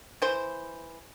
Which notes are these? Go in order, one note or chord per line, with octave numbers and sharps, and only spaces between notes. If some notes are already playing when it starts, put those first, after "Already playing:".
E3 C5